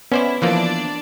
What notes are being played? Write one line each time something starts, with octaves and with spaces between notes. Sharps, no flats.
B3 C#4 E4 C5 D5
E3 F3 A#3 D4 D5